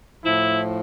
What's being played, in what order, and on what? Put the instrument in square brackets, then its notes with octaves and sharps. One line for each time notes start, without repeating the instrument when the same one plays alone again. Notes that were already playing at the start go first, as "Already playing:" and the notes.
[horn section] A2 F3 E4